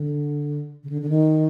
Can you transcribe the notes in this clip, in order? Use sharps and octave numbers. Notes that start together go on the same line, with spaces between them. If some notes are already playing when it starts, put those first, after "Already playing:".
Already playing: D3
C#3
D3
D3
D#3